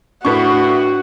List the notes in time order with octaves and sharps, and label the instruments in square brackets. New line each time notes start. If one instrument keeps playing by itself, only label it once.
[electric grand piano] A2 C#6 [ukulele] D4 B4 [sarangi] F#4